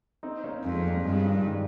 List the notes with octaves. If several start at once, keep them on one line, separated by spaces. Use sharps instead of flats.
C4 D#4
A#3 C#4
F2 G#3 C4
G3 A#3
G2 F3 G#3
D#3 G3
D#3 G3